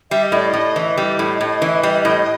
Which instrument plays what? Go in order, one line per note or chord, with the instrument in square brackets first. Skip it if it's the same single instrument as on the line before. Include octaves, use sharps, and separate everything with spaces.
[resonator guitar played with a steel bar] G3 [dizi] E5
[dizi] D#5
[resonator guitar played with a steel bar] A2 [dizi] D5
[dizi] D#5
[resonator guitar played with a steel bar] A2
E3
[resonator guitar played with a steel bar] G3 [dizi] D#5
[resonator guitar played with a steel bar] A2
A2
E3
G3
A2